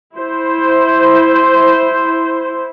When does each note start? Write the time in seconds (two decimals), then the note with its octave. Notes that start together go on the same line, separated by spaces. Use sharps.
0.16 E4 C5